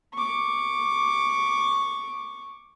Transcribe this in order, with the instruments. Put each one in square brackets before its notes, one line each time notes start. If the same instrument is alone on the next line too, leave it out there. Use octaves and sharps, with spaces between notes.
[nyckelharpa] C#6 D6